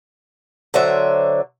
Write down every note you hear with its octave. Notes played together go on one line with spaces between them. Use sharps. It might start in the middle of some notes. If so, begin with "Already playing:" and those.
D3 F#3 C5 E5